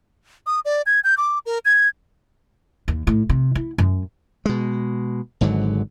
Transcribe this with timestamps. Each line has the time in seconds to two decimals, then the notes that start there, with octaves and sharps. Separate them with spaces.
0.46 D#6
0.65 D5
0.86 G#6
1.04 G6
1.17 D6
1.46 A#4
1.65 G#6
2.88 D#2
3.07 A2
3.29 C3
3.55 E4
3.78 F#2
4.46 B2 G#3
5.41 G#1 G#2 D3 F#3